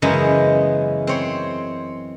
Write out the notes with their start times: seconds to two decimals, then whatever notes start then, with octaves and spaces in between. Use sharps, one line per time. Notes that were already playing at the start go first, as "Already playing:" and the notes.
0.02 F#2 C#3 E3 G#3 B3 D#5
1.07 C4 C#5 C6